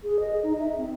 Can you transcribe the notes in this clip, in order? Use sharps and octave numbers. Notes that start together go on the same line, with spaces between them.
G#4
D#5
D#4
E5
C4